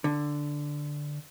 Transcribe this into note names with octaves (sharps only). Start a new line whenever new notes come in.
D3